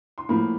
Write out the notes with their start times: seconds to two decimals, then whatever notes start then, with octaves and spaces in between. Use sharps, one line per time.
0.18 C6
0.29 A2 F3 A#3 B5